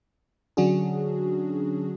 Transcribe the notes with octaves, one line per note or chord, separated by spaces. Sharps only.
D3 F#3 C#4 D4 F#4 G#4